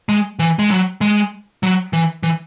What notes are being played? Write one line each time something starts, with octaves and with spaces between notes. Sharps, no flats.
G#3
E3
G#3
F#3
G#3
F#3
E3
E3